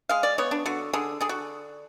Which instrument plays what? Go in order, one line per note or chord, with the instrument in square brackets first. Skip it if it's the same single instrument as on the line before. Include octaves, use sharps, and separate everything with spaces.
[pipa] G#3 F5
D5
B3 C#5
D4
D3 F#4
D3 G#4
D3 G#4
F#4